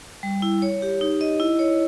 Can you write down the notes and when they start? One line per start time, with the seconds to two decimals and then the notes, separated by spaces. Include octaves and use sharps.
0.23 G3
0.42 E4
0.62 C#5
0.82 G4
1.01 D#4
1.21 D#5
1.40 E4
1.59 C#5